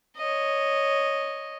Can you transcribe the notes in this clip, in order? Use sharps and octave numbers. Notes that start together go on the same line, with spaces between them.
C#5 D#5